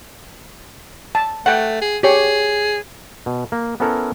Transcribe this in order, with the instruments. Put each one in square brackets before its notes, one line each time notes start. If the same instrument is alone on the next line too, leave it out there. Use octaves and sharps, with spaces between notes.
[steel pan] A5
[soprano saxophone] A3 [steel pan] F#5 G5
[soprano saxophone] G#4
[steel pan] G4 C#5 [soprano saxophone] G#4
[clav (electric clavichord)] B2
A#3
B3 C#4 E4 A4 A#4